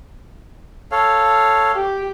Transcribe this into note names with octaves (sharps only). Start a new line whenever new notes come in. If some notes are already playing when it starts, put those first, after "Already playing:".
A4 C#5 F5
G4